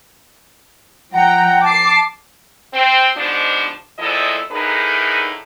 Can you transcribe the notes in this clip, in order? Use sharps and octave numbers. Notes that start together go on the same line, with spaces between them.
F3 F#5 G5 A#5
A5 D6 C7
C4
G#2 B2 F3 D4
E2 A#2 F3 E4 A4 D#5
A2 D3 D#4 G#4 A#4 B4